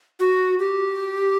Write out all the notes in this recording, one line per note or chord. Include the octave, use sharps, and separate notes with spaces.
F#4
G4